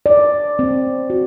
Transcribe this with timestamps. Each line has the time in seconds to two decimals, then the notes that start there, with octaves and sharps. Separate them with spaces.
0.06 D5
0.59 C4
1.10 F#4